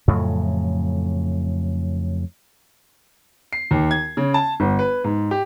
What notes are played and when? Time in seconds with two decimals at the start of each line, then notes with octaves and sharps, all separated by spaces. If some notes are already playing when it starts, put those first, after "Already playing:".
0.08 F2 A2 C#3 F#3
3.53 C7
3.71 D#2
3.91 G#6
4.17 C#3
4.34 A5
4.60 G1
4.79 B4
5.04 G#2
5.31 G4